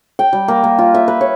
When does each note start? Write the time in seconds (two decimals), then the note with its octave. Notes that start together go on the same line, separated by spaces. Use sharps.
0.19 G5
0.33 G3
0.48 A#3
0.64 A#3
0.78 F4
0.94 E5
1.08 B4
1.21 C#5